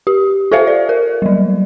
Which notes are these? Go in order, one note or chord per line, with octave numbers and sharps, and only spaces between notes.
G4
F4 A4 C5 E5 F5
D5
A#4
F#3 G3